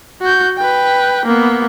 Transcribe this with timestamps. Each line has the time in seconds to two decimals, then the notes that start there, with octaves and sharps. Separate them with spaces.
0.21 F#4 G6
0.57 B4 G5
1.26 A#3 B3